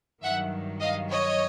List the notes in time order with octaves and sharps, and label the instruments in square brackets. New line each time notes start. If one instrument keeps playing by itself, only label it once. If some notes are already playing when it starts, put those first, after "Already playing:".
[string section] G2 D#3 F#3 E5 F#5
D#5 F5
C#5 D#5